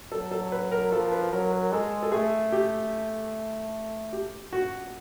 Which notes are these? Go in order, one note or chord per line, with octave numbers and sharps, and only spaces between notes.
F#3 A4
A4
B4
A#4
F3 A4
B4
F#3 A#4
A#4
G#3 A4
A4
A3 G#4
G4
G4
F#4